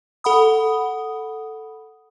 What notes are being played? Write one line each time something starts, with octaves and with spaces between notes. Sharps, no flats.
A4 F#5 B5 D#6